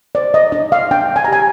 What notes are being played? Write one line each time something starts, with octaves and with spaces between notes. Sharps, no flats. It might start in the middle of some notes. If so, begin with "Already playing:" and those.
C5 D5
D#5
D4 D#5
F5
D4 G5
G#5
A#5
G4 G#5